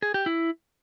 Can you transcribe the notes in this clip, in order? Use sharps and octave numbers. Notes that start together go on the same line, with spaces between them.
G#4
G4
E4